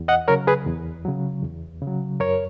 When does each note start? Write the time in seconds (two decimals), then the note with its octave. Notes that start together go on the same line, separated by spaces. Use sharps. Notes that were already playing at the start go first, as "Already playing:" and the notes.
Already playing: E2
0.08 D#5 F#5
0.28 C#3 F#3 A#4 C#5
0.47 G#4 B4
0.67 E2
1.05 C#3 F#3
1.43 E2
1.82 C#3
1.87 F#3
2.20 F#2 A#4 C#5